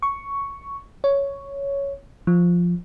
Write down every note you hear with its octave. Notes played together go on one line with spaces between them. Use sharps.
C#6
C#5
F3